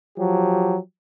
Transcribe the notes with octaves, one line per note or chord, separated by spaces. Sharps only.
F3 F#3 G4